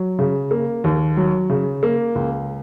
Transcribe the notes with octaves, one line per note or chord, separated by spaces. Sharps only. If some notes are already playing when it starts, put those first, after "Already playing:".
Already playing: F#3
C#3
A#3
D#2
F#3
C#3
A#3
C#2